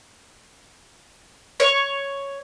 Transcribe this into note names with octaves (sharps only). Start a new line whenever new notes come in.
C#5 C#6